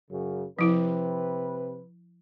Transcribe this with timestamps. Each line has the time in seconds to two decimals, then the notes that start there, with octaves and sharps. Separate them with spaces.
0.11 F#2 C#3
0.59 C3 F3 E4 B4